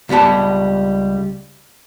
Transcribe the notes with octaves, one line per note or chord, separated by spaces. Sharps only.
C#2 G3 B3 G4 A5